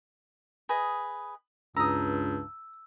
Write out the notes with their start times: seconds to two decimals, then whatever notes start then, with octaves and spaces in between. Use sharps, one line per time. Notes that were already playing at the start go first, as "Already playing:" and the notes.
0.69 G#4 B4 D#5
1.76 C#2 G2 A#5 D#6 E6